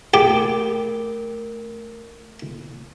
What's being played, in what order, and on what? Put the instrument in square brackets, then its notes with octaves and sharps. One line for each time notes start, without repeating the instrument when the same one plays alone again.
[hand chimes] A3 A#4 D7 [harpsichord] G4